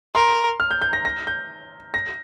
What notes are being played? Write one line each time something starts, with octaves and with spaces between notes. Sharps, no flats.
A#4 C6
F6
G6
G6
A#6
A#6
G6
A#6